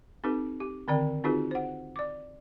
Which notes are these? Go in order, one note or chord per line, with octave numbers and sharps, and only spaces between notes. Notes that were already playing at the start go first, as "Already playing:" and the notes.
C4 D#4 G4 A4 B4
G4
D3 D#3 C4 A#4 D5 G5
C4 D#4 F4 F#4 G#4 B4
C5 F#5
D5 D6